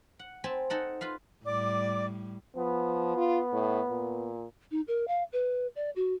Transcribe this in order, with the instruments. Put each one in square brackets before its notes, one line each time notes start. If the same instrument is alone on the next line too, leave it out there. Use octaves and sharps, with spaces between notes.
[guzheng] F#5
C4 G#5 A5 B5
D#4 A4 F#5
F4 B4 F5
[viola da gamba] A2 G3 [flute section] D5 D6
[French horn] F3 [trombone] B3
[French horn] F4
A2
A#2
[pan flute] D#4
A#4
F5
B4
D5
F#4